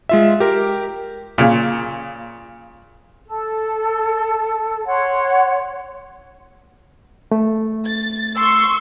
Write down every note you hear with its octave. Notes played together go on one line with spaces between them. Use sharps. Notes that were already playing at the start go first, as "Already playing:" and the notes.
G#3 F4 E5
G4 A#4
A#2 C#3
A4
C#5 F#5 C6
A3
A6
C6 C#6 E6